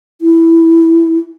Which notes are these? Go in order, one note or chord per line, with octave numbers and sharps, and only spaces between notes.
E4